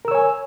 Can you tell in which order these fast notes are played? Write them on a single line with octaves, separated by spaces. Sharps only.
A#4 E6 C#5 G#5